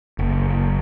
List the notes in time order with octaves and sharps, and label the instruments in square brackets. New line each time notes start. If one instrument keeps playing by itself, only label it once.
[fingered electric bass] F#1